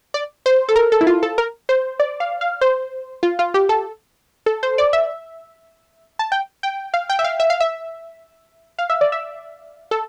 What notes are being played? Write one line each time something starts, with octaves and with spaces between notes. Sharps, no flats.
D5
C5
A4
A#4
A4
E4
F4
A4
A#4
C5
D5
F5
F5
C5
F4
F4
G4
A4
A4
C5
D5
E5
A5
G5
G5
F5
G5
E5
F5
E5
F5
E5
F5
E5
D5
E5
A4